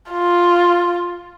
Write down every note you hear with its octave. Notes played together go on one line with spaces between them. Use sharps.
F4